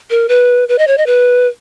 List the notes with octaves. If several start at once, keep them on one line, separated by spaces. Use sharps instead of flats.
A#4
B4
B4
D#5
C#5
D#5
B4